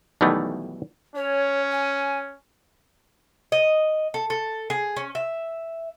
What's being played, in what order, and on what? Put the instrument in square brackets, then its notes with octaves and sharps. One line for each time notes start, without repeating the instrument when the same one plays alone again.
[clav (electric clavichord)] B1 B2 D#3 E3 G3 A3
[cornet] C#4 [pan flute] C#5
[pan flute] G#5
[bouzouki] D#5
A4
A4
G#4
C#4
E5